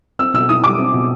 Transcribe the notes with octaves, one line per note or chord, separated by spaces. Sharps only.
C4 E6
B2 E6
E4 D#6
G3 D6
C4
B2